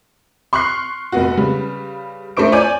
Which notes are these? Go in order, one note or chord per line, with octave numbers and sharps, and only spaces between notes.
C6 C#6 F6 F#6 C7
F1 B3 F#4
C#3 G3 B4
A3 C#4 D4 C5 C#6 D7
C#5 D5 G#5 D6 G6